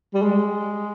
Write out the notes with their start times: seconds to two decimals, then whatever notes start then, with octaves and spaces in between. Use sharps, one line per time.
0.14 G3
0.22 G#3